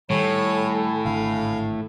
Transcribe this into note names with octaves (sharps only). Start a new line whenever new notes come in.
A2 D#3 G3 A4 C#5 G#5 B5
G#1 D3 F5